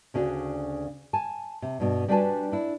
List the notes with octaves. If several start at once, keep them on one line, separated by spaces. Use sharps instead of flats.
D2 C#3 D4 F#4
G#5 A5
C3
G2 B2
G3 D4 F#4 B4 G#5 A5
D4 E4